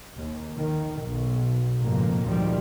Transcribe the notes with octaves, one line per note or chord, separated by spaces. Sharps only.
D#2
D#3
B1
A1 F2 G#2 C#3 A#3
D2 A#2 D#3 F3 G3